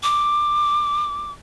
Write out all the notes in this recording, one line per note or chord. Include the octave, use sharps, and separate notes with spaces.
D6